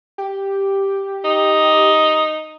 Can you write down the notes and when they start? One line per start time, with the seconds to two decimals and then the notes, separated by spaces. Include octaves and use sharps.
0.18 G4
1.25 D#4